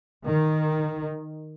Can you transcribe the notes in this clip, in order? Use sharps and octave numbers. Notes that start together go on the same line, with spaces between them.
D#3